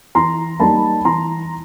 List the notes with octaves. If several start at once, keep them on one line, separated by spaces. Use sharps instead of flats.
E3 A#5 C6
G3 A#3 D#4 A5 B5
E3 A#5 C6